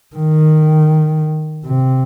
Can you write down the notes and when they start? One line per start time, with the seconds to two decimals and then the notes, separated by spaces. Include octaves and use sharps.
0.16 D#3
1.65 C3